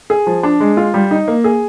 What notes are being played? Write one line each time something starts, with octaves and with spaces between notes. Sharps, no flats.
G#4
F3
D4
G#3
F4
G3
D#4
A#3
G#4